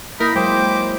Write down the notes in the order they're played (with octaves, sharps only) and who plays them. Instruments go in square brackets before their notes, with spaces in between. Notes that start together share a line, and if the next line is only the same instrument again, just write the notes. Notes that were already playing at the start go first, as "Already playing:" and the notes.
[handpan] A#3 E4 E5 [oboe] D#4 [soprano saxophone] A#4 [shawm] B5
[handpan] F#3 G#3 [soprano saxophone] C5 [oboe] G5 [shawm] D6